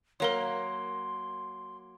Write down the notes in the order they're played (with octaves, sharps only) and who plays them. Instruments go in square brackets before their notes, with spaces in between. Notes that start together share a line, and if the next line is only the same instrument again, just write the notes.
[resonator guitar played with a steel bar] F#3 A#3 [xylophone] A#4 C#5 [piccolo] C6